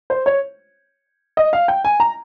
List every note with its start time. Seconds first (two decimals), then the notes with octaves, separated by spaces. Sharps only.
0.10 C5
0.26 C#5
1.37 D#5
1.53 F5
1.68 G5
1.85 G#5
2.00 A#5